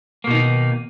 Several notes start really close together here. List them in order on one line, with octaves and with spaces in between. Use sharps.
A#3 B2 D#4 D#3